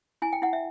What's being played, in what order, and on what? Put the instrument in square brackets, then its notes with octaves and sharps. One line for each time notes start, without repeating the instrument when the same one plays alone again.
[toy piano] E4 G#5
G5
E4 F#5
E5